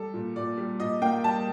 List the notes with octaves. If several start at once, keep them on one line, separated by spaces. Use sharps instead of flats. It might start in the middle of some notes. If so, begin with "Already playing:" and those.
Already playing: G3 A4
A#2
A#2 D5
G3
A#2 D#5
A#3 G5
G3 A5